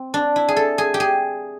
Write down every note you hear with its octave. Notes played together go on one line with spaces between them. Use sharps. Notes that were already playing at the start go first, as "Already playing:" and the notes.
Already playing: C4
D4
E4
G#4
A4
G#4
G4
G#4